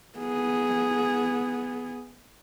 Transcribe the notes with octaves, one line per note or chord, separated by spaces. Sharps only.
B3 G#4